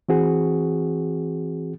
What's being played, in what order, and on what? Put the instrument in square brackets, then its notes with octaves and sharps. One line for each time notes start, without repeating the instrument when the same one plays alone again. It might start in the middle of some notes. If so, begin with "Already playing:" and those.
[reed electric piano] E3 C4 F#4 G#4